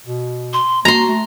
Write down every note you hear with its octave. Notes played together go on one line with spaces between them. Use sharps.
B2
C6
A#3 F#4 A#5 C6
A3